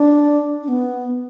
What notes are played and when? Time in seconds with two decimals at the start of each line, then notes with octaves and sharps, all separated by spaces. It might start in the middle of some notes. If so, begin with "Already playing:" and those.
Already playing: D4
0.63 D4
0.68 B3